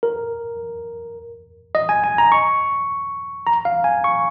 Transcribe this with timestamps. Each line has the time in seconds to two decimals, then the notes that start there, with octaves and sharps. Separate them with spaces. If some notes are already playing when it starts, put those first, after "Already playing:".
0.03 A#4
1.75 D#5
1.89 G#5
2.04 G#5
2.18 A#5
2.32 C#6
3.47 A#5
3.65 F5
3.84 G#5
4.04 C#6